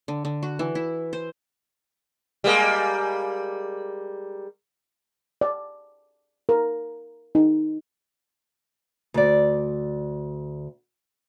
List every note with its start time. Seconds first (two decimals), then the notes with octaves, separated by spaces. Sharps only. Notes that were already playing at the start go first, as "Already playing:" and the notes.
0.08 D3
0.25 D3
0.43 F#4
0.59 E3
0.75 E4
1.13 C5
2.44 G3 G#3 A#3
5.41 D5
6.49 A#4
7.35 D#4
9.14 D2 D5